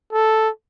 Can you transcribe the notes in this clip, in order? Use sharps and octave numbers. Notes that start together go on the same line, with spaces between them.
A4